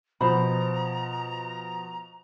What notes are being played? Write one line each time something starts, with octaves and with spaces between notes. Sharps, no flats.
B2 F3 C5 A#5 B5